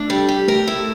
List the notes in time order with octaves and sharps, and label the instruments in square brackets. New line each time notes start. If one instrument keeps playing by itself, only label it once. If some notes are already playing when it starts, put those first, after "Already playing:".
Already playing: [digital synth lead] A3 [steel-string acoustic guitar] D4
[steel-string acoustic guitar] G3
G4
[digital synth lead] A3 [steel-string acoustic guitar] A#4
[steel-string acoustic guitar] E4